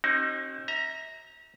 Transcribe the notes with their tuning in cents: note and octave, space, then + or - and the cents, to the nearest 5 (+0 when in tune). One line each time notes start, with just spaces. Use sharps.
C4 +45 D#4 +0 F#4 +30
E5 -35 A#5 +0